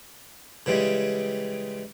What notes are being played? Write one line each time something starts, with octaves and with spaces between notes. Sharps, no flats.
C#3 E3 G3 G#3